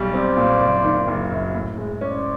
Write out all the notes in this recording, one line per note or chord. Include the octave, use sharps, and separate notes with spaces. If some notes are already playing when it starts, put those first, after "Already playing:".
Already playing: B1 G3
C4 C5 D5
A#2
F#1
D#3
F#1
F#2
A2
G#3
C#4 C5 D5